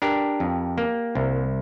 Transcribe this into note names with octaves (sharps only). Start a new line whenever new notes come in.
D4 G4 A#4
F2
A#3
C2